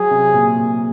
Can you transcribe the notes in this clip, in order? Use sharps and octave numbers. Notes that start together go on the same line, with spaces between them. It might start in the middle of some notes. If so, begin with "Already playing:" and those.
Already playing: F#3 G#4
C3
A#2